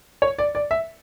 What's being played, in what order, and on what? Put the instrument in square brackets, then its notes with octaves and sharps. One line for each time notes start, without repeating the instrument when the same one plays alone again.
[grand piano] C#5
D5
D5
E5